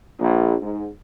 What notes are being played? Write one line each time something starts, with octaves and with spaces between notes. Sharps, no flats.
A#1
G#2